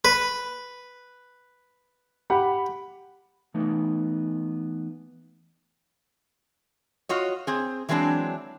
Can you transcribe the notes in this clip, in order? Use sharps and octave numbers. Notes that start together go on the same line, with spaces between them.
B4
G4 F#5 B5
E3 A3 B3 D#4
F4 F#4 C#5 D#5
C4 G#4
E3 F#3 G#3 C4 D4